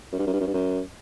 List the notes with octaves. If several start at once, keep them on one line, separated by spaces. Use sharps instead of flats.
F#2
G2
F#2
G2
F#2
G2
F#2